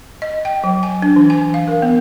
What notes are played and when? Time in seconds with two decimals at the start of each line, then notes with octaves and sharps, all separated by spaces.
0.22 D#5
0.45 G5
0.64 F#3
0.83 G#5
1.02 D4
1.16 E3
1.30 G#5
1.54 F5
1.68 A#4
1.82 B3